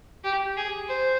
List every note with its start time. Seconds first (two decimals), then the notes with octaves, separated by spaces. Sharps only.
0.24 G4
0.57 G#4
0.88 C5